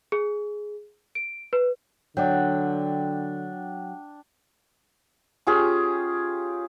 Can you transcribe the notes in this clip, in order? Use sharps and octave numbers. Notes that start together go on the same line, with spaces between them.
G#4
D7
B4
D3 F#3 D4 G5
C#4 F4 G4 G#4